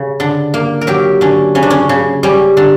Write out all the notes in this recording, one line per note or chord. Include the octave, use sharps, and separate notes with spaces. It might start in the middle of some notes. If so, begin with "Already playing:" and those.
Already playing: C#3
D3
A#3
A#4
F#3 G4
D3 C#4
C#3 C#4
D4
C#4
C#3
G3 C#4
D3